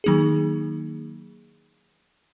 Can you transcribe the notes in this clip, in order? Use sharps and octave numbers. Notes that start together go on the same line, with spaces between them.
D#3 F#3 A#3 D#4 G#4